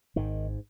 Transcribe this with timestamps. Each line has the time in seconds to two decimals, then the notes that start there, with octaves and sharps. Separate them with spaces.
0.16 G#1 G#2 D#3